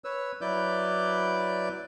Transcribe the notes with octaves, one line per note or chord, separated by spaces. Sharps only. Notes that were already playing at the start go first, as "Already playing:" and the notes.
B4 C#5 E6
F#3 E4 B4 D5 D6 G6